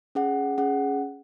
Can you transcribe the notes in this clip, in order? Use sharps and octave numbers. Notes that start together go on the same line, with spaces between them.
C#4 G#4 F#5
C#4 G#4 F#5